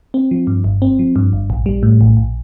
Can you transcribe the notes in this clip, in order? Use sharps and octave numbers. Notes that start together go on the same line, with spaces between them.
C4
F3
G2
G1
C4
F3
G2
G1
A#1
G3
A2
A#1
A#1